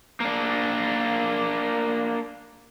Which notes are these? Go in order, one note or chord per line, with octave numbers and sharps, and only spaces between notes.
A#3 D4